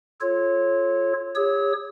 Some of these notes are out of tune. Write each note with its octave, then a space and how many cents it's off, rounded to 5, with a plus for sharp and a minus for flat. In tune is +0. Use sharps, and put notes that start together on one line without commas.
F4 +0 A4 -20 C#5 -20
G4 +45 C#5 +0 E6 -40